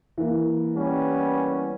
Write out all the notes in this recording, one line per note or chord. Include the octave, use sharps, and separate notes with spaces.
E3 A#3
G3 B3 C#4